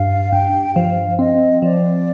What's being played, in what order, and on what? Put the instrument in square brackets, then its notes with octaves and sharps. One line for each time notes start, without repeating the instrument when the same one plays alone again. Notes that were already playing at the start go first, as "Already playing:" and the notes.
Already playing: [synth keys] G2 [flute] F5
[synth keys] G2 [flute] G5
[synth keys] F3 [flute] F5
[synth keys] C4 [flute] D#5
[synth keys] F3 [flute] D5